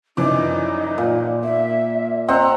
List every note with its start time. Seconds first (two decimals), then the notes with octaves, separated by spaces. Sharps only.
0.17 F#2 E3 F3 D#4 D5
0.98 A#2
1.43 A#3 E5
2.28 C4 D#5 F#5 A#5 E6